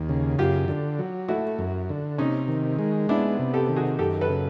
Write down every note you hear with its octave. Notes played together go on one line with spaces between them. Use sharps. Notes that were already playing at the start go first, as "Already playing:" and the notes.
Already playing: D#2
C#3
F#2 F4 G4
D3
F#3
A3 E4 F#4
F#2
D3
C3 C#4 D#4
D#3
G#3
B3 D4 E4
C3
G4 A4
D#3
F#4 G#4
F#2 G4 A4
A4 B4
C#3